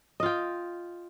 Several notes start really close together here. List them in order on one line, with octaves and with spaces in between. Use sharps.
D#5 F4 G5